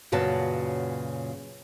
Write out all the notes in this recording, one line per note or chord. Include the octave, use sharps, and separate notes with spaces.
F#2 A#2 C#3 F#4 B4 A5